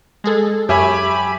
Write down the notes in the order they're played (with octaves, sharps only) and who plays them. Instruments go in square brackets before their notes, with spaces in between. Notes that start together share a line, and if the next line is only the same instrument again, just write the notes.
[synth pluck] G#3 G#4 A4
[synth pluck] F#2 C#5 [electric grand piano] G4 E5 G#5 [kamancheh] B5